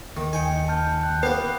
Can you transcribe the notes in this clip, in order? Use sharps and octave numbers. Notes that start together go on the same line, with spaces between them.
D#2 D#3
D#4 D#5 G5 G#5 C#7
A5 F6 G6
G5 F#6 G6
A#3 B3 B4